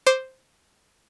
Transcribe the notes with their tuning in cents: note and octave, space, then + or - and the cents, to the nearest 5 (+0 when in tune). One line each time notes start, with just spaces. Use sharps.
C5 +0 D6 +0